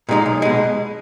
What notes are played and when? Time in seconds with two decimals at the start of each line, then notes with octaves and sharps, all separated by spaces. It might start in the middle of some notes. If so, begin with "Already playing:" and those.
0.09 A#2 G#3 D#4
0.26 B1
0.42 B2 G#3